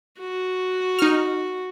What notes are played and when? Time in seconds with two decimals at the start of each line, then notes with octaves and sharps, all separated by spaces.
0.19 F#4
0.99 D#4 F6